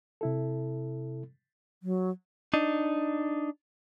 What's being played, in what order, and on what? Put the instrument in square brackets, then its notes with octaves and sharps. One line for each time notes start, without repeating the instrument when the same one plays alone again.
[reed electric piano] C3 E4 A4
[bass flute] F#3
[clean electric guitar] D4 D#4